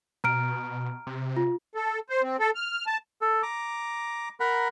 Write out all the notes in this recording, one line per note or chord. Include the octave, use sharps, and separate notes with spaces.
B2 A#5 F6 D7
C3
F4
A4
C5
C4
A4
F6
A5
A4
A#5 D6
A#4 F#5 A#5 B5